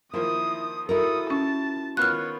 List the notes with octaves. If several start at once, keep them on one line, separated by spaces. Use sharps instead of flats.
D#3 F3 A#3 E4 D#6
E4 F#4 A4 A#4 D#6
C#4 A5
D#3 B3 F4 C#5 F6 F#6